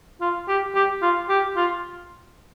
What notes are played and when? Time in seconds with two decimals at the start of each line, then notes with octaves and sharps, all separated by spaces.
0.21 F4
0.48 G4
0.75 G4
1.02 F4
1.29 G4
1.57 F4